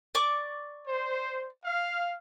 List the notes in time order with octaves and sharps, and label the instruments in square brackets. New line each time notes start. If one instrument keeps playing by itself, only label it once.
[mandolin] D5 C#6 D6
[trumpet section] C5
F5